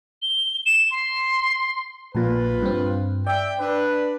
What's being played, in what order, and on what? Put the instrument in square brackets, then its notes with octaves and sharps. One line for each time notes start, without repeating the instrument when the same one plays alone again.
[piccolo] G7
E7
C6
[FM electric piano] A#1 A#2 [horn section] F4 B4
[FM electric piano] G2 C4
[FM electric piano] D5 [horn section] E5 G5
[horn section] D4 B4